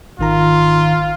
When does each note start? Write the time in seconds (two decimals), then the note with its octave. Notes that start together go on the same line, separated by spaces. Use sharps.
0.19 G#1 D#3 F4 A#5